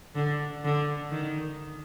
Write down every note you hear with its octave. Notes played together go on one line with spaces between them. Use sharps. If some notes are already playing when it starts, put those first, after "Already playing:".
D3
D3
D#3